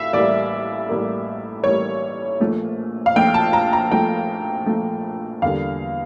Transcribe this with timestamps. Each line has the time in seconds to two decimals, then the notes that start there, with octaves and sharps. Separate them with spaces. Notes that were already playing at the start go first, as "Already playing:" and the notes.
Already playing: A1 A2 E5 F5
0.13 A1 A2 G3 A#3 D5
0.89 A1 A2 G3 A#3
1.64 A1 A2 G3 A#3 C#5
2.40 A#1 A#2 A3
3.06 F5
3.16 A#1 A#2 A3 G5
3.34 A5
3.53 A#5
3.73 A#5
3.91 A#1 A#2 A3 G5
4.66 A#1 A#2 A3
5.42 E2 D3 G3 A#3 F5